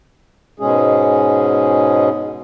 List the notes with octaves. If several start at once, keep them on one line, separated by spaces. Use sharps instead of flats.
G#2 B2 G#3 C#4 G#4